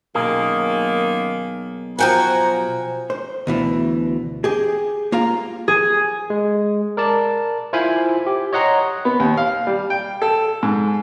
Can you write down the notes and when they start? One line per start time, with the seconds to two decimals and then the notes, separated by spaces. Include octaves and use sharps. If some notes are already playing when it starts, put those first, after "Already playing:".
0.15 B1 F#2 D#3 A#3 G#4
1.99 F3 F#4 G5 G#5 A#5
3.10 C5
3.47 D2 B2 E3
4.44 G4 G#4
5.12 A#3 F4 F5 A#5
5.68 G#4
6.30 G#3
6.97 A#4 D5 A5
7.73 E4 F4 C5 F5 G#5 B5
8.27 G4
8.53 C#5 D#5 F#5 A#5 C6
9.05 B3
9.20 D#2
9.37 F5
9.67 G3
9.90 G5
10.22 A4
10.63 G#2